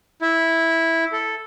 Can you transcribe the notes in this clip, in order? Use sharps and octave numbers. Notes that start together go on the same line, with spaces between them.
E4
A4